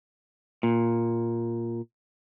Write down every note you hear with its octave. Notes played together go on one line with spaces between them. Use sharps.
A#2